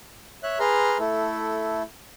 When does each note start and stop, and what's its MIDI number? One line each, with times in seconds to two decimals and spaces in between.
0.43 0.59 73
0.43 0.59 76
0.43 0.59 90
0.60 0.98 68
0.60 0.98 71
0.60 0.98 82
0.60 0.98 84
0.60 0.98 89
0.99 1.83 57
0.99 1.83 64
0.99 1.83 69